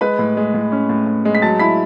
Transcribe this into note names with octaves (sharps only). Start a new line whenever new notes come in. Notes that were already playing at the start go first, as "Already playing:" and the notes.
G#3 B4 B5
A2
G#3
A2
C#4
A2
A2
G#3
B6
F#3 A5 A6
E4 B5 B6